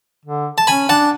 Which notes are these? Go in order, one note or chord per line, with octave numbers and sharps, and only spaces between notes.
D3
A5
C#4 G#5 B5
D4 F#5 A5